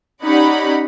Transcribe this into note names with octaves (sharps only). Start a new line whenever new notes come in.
C#4 D#4 G4 D5 F#5 B5